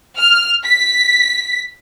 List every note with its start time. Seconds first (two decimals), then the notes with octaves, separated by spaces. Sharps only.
0.18 F6
0.65 B6